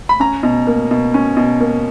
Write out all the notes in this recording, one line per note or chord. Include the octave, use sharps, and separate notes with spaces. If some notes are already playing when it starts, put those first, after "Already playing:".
B5
C#4 A#5
B2
A#3
B2
C#4
B2
A#3